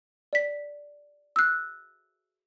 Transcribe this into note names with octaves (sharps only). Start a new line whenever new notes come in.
D5 B6
E6 F#6